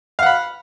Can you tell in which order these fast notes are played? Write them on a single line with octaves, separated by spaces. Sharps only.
F5 F#5 B5